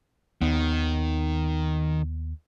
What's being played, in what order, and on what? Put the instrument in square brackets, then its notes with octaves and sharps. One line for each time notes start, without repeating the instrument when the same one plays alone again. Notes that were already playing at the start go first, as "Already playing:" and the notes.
[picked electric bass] D#2 B3 [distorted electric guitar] D#3